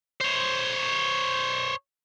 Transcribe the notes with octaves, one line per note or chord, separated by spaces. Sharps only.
C5 C#5